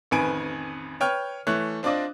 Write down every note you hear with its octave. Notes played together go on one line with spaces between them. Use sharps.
A1 F2 D#3 B4 G#5 D7
B4 C#5 G5 F6
E3 A3 C#5 F#6
C4 D4 F4 D5 D#5